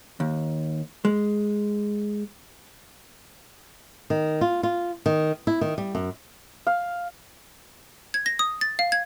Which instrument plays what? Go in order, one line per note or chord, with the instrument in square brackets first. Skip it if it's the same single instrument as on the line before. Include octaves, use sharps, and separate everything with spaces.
[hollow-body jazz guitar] D#2
G#3
[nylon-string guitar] D#3
F4
F4
D#3
E4
D#3
G3
F#2
[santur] F5
[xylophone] G#6
A#6
D#6
A6
F5
G#6